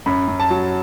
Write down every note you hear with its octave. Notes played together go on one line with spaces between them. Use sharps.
F#2 B5
F#2
A5
F#3